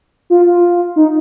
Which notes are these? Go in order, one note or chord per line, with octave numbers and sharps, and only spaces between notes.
F4
F4
D#4